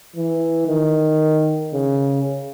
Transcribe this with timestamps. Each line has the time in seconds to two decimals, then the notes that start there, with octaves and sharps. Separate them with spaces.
0.16 E3
0.68 D#3
1.73 C#3